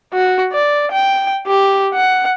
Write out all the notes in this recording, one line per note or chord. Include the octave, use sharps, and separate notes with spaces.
F#4
D5
G5
G4
F#5